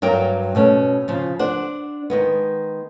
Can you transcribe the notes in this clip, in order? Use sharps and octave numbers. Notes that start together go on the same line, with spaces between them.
G2 F#3 A#4 G5
B2 A3 C#4
C#3 F3
D4 C5 F#5
D#3 G#3 B3